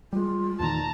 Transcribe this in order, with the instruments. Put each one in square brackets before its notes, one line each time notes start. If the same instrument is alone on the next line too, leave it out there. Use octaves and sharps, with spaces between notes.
[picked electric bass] G3 G#3 [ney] F4
[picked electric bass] E2 A#2 D#3 [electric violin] A5 A#5